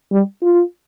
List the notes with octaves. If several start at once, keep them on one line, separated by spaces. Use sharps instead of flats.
G3
F4